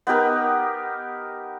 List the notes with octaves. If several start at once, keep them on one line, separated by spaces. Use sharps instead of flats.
B3 D#4 G4 A#4